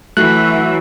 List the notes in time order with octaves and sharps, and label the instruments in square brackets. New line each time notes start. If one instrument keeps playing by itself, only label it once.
[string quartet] E3 [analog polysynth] F#3 F#4 E5 [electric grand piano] A3 [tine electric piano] F#6